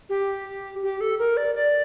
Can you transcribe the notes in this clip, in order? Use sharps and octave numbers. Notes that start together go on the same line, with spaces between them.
G4
G4
A4
A#4
D5
D5